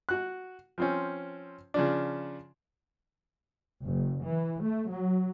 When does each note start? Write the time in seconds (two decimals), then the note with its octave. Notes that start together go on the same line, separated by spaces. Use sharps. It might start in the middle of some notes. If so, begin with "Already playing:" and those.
0.09 F#4 F#6
0.78 F3 C4 C#4
1.74 C#3 F3 D4
3.84 F#1
4.23 E3
4.60 A3
4.91 F#3